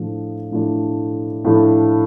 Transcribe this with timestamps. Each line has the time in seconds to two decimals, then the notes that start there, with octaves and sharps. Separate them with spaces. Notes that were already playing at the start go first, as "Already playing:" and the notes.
Already playing: A2 F3 A3 D4
0.52 A2 F3 A3 D4
1.45 A2 F3 A3 D4